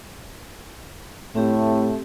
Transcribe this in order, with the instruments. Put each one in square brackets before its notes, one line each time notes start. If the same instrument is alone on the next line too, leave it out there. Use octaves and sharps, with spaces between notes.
[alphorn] A2 [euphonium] A3 [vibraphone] C4 G4